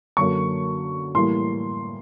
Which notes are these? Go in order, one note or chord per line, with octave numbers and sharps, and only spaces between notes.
F#2 D3 F#3 A#3 C#6
A2 E3 G3 A#3 C6